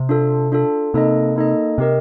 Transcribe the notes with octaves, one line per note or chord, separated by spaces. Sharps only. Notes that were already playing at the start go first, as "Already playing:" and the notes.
Already playing: C3
D4 F4 A4
D4 F4 A4
C3 A#3 D#4 A4 D#5
A#3 D#4 A4 D#5
C3 C4 G4 A#4 D#5